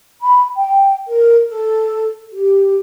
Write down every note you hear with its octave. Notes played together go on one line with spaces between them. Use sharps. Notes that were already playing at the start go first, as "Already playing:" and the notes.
B5
G5
A#4
A4
G4